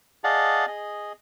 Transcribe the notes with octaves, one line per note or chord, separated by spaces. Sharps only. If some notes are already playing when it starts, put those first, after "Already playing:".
G#4 D5 D#5 F5 F#5 A5
G#4 D#5